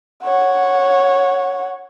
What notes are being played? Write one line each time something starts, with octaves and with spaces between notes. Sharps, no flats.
C#5 F#5